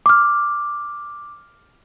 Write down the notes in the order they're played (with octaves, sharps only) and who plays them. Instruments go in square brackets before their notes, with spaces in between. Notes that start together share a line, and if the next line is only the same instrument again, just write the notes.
[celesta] D6 F6